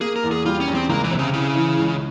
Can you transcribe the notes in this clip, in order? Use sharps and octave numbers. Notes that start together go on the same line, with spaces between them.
A#3 G#4
A#4
E2
G#4
G3 F4
C#4
E2
C4
C#2 A#3
E3
C3
C#3
C#3 E4
E3
C#2